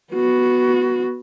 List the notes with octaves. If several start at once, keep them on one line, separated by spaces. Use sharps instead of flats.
B3 F#4